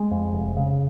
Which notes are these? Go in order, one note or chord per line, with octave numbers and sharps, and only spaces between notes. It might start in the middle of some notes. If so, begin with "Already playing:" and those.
Already playing: G#3
F2
F1
C#3